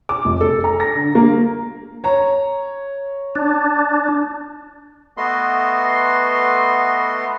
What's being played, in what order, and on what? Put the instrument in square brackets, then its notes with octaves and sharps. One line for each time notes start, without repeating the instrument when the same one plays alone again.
[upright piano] D6
F1
A4
A#5
A#6
D3
A#3
[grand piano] C#5 A#5
[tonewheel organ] D4
[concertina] A3 B3 F#4 B4 D#5 C6